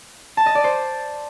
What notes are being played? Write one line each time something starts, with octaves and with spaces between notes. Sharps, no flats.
A5
D#5
D5
C5